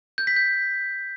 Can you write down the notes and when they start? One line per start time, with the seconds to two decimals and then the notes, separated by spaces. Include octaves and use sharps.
0.18 G6
0.27 B6
0.36 G6